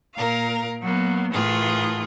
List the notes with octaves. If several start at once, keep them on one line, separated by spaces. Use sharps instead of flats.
A#2 A#4 F5
F#3 A#3 B3
A2 E3 A3 F4 G#4 A#4